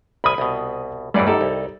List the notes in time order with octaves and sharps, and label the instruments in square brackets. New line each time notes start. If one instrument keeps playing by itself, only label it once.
[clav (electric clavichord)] C2 G#5 [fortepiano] B5 D#6
[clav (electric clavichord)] C2 B2
[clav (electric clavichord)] B1 E2 E3 [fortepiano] G2 D5
[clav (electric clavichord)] F#2 [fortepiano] G3 D#4 A4
[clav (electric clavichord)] C2